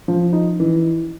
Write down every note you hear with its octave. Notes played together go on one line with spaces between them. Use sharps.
F3
D#4
E3